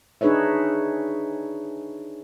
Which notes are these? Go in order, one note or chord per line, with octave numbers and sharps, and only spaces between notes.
D4 D#4 G#4 B4 C#5 E5